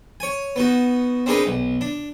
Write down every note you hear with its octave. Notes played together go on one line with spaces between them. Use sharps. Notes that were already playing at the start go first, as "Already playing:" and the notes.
C#5 G#5
B3 D#4 F#4
C4 D4 D#4 G#4 A#4 B4
B1
D4